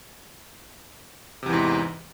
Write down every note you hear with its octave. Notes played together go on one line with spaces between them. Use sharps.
E2 G#2 C3 E3